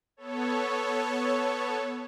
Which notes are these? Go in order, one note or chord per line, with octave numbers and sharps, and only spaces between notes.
B3 A4 C#5